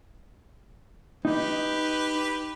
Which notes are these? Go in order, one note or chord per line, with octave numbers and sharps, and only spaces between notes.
D#4 G4 B4